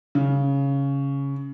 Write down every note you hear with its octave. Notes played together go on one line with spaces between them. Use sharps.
C#3